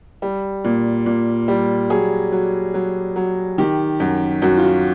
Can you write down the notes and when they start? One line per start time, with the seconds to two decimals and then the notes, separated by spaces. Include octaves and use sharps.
0.22 G3
0.64 A#2
1.06 A#2
1.48 G3
1.90 F#3 G#4
2.32 F#3
2.74 F#3
3.16 F#3
3.58 D#3 G4
4.00 F#2
4.42 F#2 F#4
4.57 F4
4.63 F#4